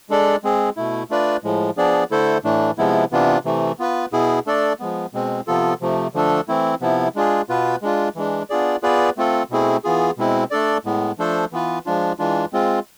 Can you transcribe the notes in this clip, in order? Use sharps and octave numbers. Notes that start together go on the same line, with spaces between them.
G#3 D4 A4 D5
G#3 C4 G#4
B2 A3 E4
A3 D4 F4 B4 D5
A2 F3 G#3
F3 B3 D4 G#4 D5
D3 A3 E4 A4 C5
A2 E3 A3 D4
C3 F3 G#3 B3 E4
C3 E3 B3 D4 F4
C3 E3 A3
B3 F4 B4
B2 B3 E4 G#4
A3 D4 A4 D5
F3 G#3 B3
B2 G#3 C4
C3 F3 B3 F4 A4
C3 F3 A3
D3 F3 A3 D4 A4
E3 A3 C4 E4
C3 F3 B3 E4
G#3 D4 F4 G#4
B2 B3 F4 B4
G#3 D4 F4
E3 G#3 D4
B3 D4 F4 G#4 D5
B3 F4 G#4 B4 D5
A3 C4 F4 A4
B2 A3 C4 E4 G#4
E3 B3 F4 G#4
B2 G#3 C4 E4
A3 D4 A4 D5
A2 G#3 B3
F3 A3 D4 A4 C5
E3 B3 F4 B4
F3 G#3 D4 F4
E3 G#3 D4 F4
G#3 C4 F4